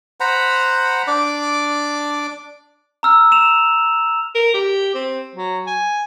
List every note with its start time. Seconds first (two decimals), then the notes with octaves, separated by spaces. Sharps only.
0.20 C5 F#5 A#5 B5
1.08 D4 D5 D6
3.03 A#5 E6 F6
3.32 E7 F7
4.35 A#4
4.54 G4
4.94 C4
5.35 F#3
5.67 G#5